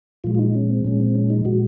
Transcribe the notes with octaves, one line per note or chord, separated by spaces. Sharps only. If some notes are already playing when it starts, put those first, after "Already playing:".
A#2 F3 G#3 F4
F4
D#4
C#4
C4
A#2 F3 G#3 C#4
C4
C#4
D#4
A#2 F3 G#3 F#4